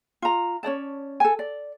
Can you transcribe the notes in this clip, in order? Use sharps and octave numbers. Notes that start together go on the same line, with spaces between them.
F4 A#5
C#4 C#5 D5 A5
A4 G#5
D5